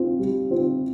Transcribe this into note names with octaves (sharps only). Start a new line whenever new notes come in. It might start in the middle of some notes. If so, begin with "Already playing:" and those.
Already playing: C4 F4
G3
C4 F4